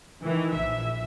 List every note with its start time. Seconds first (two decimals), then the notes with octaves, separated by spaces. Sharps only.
0.22 D#3 E3
0.54 A#1 E5